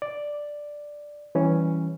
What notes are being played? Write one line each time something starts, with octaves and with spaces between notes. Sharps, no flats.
D5
E3 G3 C#4